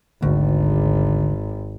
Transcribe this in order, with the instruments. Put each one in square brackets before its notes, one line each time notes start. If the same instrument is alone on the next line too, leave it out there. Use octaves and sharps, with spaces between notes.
[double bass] G#1 [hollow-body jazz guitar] D2